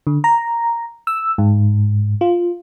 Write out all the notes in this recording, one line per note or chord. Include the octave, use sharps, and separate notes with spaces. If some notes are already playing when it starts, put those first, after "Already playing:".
D3
A#5
E6
G#2
F4